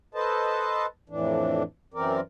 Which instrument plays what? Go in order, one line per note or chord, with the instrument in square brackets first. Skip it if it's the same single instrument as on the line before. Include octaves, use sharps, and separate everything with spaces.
[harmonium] A4 B4 C5 D#5 A5
F2 A2 E3 D4
F#2 E3 C4 A#4 D5